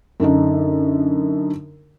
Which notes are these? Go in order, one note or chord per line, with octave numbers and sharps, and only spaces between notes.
F#2 D3 D4 D#4